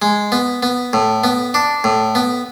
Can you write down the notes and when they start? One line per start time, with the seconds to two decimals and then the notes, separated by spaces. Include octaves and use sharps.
0.02 G#3
0.32 B3
0.63 B3
0.93 A2
1.24 B3
1.54 D4
1.84 A2
2.15 B3